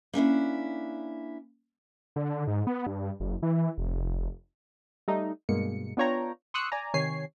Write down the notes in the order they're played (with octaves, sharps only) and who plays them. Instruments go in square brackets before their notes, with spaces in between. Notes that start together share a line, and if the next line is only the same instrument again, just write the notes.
[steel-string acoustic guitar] A#3 C#4 D4 E4
[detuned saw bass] D3
G#2
B3
G2
F#1
E3
F1
[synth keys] G3 A3 D#4
G2 B2 G#3 A#3 C#7
B3 D4 F4 C#5 G5 A#5
C6 C#6 D#6 E6 F#6 C#7
D5 G#5 A#5
C3 D#3 C#5 G#5 C7